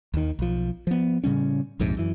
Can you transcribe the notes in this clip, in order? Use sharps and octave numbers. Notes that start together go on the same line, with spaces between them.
D#2 D#3
B1 F3
F3 B3
A2 C#3 G3 C#4
A#1 F2 G#2 C3
F#2 E3